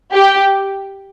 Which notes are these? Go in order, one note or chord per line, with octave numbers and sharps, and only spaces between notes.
G4